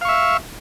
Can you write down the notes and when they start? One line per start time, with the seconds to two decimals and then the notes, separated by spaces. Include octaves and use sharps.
0.01 F5
0.05 C#6
0.09 E5